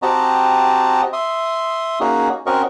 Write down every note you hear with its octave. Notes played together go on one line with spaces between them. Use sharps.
C4 F#4 G4 D#5 A5 A#5
E5 C6 D#6
A#3 C#4 D#4 F#4 G#4
C4 C#4 F#4 A#4 D#5 C#6